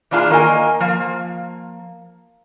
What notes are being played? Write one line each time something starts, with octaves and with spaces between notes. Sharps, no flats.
E3 A#3 D4 F4 G#4
D#3 A#3 A#4 D#5 G#5
F3 A#3